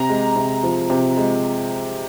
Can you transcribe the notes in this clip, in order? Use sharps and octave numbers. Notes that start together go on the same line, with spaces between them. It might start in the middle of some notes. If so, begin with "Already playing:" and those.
Already playing: C3 A#5
G#3
C3
F3
C3
G#3